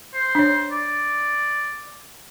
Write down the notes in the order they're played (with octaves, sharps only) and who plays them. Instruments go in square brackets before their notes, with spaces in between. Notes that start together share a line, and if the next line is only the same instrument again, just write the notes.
[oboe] C5
[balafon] D4 C#5
[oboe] D5